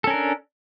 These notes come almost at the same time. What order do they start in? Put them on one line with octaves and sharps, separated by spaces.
A4 C#4 A#4 D4